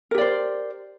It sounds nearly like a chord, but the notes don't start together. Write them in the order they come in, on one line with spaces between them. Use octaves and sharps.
A#4 G4 D5 C5